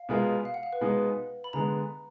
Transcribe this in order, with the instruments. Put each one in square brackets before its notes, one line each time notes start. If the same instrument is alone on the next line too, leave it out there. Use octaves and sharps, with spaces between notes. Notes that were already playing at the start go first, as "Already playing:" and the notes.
Already playing: [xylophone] F5
[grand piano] B2 G#3 B3 F4 A#4
[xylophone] F5
F#5
F5
B4
[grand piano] B2 G#3 B3 D#4
[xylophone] B5
[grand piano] D3 G#3 B3 [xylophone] A#5